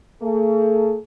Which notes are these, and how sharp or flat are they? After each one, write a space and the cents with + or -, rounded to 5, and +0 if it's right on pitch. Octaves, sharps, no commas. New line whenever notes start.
A3 +40 G#4 +35